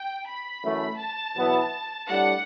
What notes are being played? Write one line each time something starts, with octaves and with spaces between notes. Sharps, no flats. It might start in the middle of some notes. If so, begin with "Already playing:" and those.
Already playing: G5
B5
F#2 E3 A3
A5
E2 B2 F#3 B3 E4
A2 G3 D4 F#5